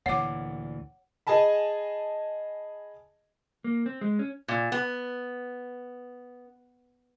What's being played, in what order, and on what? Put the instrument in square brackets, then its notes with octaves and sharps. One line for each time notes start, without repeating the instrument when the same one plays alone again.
[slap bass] D2 A#2 E3 [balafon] C#5 D6 [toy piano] F#5
[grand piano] G#4 D#5 G#5 A5 B5
[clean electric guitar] A#3
C4
G#3
C#4
[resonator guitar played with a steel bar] A#2
B3